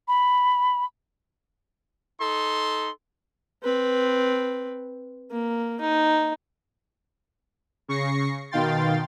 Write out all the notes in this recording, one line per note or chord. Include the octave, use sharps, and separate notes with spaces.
B5
D#4 A4 C6
C4 B4
A#3
D#4
C#3 C#6 A#6 C7 C#7
B2 D#3 F5 G5 C6 A6